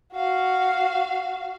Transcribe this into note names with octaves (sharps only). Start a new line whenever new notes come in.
F#4 F5